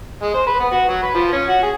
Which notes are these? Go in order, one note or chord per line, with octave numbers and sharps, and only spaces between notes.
G#3
C5
B4
B3
F#4
F#3
B4
F3
C#4
F#4
G#4